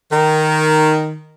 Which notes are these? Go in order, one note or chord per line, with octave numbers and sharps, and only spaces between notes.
D#3